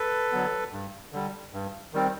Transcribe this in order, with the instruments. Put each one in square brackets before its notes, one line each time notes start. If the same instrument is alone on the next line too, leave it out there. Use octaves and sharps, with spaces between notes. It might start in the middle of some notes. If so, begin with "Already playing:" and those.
Already playing: [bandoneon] A4 B4
D3 F#3 B3
G2
D3 G3
G2
D#3 G3 C4